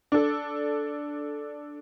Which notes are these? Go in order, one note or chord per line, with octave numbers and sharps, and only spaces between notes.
D4 A4